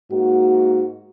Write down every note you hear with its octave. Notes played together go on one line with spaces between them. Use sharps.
G#2 A#3 F#4